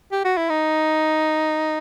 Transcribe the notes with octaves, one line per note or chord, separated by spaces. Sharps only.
G4
F#4
E4
D#4